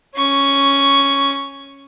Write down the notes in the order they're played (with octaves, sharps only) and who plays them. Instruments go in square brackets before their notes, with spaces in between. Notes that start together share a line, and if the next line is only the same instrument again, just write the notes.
[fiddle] C#4 C#6